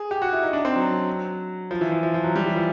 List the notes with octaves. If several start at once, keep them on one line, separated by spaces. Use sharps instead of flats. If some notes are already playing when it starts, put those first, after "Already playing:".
Already playing: G#4
G4
F#4
E4
D#4
D4
C4
F#3
F3
E3
F3
F3
F3
F#3
G3
E3
F3